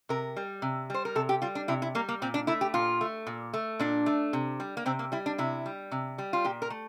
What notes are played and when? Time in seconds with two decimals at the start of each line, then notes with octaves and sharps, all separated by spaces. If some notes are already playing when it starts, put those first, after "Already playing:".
0.09 C3 A#4
0.36 G3
0.62 C3
0.90 G3 C5
1.05 A#4
1.15 C3 A4
1.29 G4
1.42 G3 F4
1.55 D4
1.68 C3 E4
1.82 E4
1.95 G3 A#3
2.09 A#3
2.22 A#2 C4
2.34 D4
2.47 A3 E4
2.61 G4
2.74 A#2 F4
3.01 A3
3.27 A#2
3.54 A3
3.79 A#2 D4
4.06 A3
4.33 C3
4.60 G3
4.77 A#3
4.86 C3 C4
4.99 A#3
5.12 G3 E4
5.26 D4
5.38 C3 E4
5.66 G3
5.92 C3
6.18 G3
6.33 F4
6.44 A#2 G4
6.62 A#4
6.70 A3